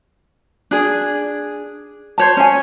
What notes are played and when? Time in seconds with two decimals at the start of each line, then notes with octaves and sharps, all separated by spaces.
0.71 D4 G#4
2.18 C5 C#5 A5
2.37 C#4 G#5